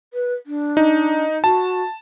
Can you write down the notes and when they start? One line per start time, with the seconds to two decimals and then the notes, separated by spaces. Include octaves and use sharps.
0.14 B4
0.46 D4
0.77 D#4
1.44 F#4 A5